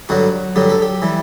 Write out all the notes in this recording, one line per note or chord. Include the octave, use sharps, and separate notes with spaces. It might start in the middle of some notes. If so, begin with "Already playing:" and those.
G2 D3 F#3 F#4
G2 D3 F#3 G4
A4
G4
E3 G3